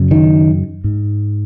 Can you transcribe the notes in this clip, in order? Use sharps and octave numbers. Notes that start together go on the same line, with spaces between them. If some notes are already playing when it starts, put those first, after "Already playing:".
Already playing: F#2 C#3
D#3
G#2